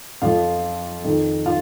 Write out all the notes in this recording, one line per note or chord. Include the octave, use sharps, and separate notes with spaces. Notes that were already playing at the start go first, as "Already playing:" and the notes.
F2 F3 F4 F5
F2 D#3
F4 F5